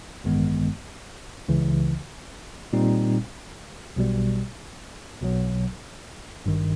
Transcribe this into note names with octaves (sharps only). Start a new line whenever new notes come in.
A1 G2 D#3 G#3 B3
C#2 C#3 E3
A#2 G3 C4 D#4
B1 B2 G3
B1 B2 F#3
G#1 G2 D#3